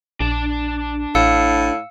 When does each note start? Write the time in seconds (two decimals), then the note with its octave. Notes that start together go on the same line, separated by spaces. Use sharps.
0.20 A#1 D4 A5
1.15 A1 A2 F5 E6 C#7